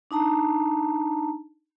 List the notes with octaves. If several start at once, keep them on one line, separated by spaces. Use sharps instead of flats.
D4 D#4 A5 A#5